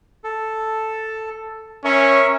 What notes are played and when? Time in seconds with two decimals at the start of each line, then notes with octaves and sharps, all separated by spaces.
0.24 A4
1.85 C#4 A#4 E5 C#6